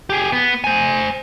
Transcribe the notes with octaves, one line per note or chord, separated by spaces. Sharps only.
G4 G#4
B3
C5 G#5